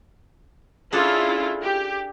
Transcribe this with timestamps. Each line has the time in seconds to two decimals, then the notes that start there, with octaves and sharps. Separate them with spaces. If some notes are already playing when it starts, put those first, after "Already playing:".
0.93 C#4 D4 E4 F4 G#4 A4
1.63 G4